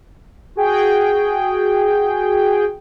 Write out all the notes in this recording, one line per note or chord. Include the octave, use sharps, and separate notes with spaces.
F#4 G#4 G5